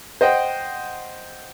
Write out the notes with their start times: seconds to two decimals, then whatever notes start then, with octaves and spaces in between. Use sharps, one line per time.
0.21 C5 D#5 F#5 G5